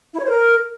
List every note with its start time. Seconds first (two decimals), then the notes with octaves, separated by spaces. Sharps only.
0.14 E4
0.19 C#5
0.24 C5
0.30 A#4